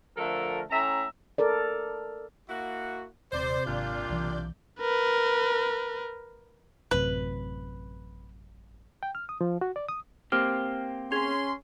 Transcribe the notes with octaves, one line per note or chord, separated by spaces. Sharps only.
D3 F3 A3 A4 A#4
A2 C#4 E5 A#5
A4 A#4 D5
A#3 E4 F#4
D#1 C3 C5 D5 G6
G#1 A#2 D4 F4
B1 E3
A#4 B4
A1 F#2 C3 B4
G5
F6
D#6
F3
F#4
D5
D#6
A#3 C4 G4 F6
C#4 G#4 C6 G#6 F7